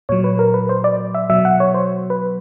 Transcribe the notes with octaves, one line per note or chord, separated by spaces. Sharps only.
A#2 F#3 C#5
B4
A#4
B4
C5
D5
E5
B2 F#3 E5
F#5
C#5
C5
B4